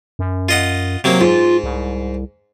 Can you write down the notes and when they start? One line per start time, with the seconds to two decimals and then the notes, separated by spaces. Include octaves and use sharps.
0.19 F#2
0.49 F4 D#5 F#5
1.04 C3 F#3 A#3
1.21 G#2 F4
1.64 C2